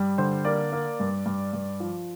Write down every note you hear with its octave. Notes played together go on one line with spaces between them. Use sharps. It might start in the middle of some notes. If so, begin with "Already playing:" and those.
Already playing: G2 G3
D3 C5
A#3 D5
A#3
G2
G2
G2
F3